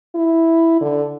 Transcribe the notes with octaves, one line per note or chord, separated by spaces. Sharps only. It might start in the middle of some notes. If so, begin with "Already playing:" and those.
E4
D3